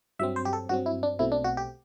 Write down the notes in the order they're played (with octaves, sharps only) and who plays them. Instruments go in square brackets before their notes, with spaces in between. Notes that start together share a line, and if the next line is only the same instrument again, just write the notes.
[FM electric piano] G2 F#3 C4 E5
C5
G4
A4
G2 F#3 C4 F#4
E4
D4
B1 B2 A3 C4 E4
D4
F#4
G4